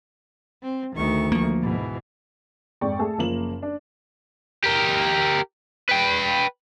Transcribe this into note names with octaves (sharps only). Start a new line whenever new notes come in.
C4
D2 D#3 A3 C#6
F3 A#3
G#2 B2 E3
F2 G#2 D5 G5 C#6
A3 G#4 A4
F#1 F3 A#3 E7 F#7
D4
G4 A#4
B4 G5